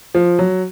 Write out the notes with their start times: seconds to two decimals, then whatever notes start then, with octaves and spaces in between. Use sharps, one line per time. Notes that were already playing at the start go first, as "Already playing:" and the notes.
0.15 F3
0.39 F#3